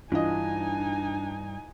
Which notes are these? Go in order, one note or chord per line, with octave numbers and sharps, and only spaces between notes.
G2 E3 D4 D#4 F4 D#5 G#5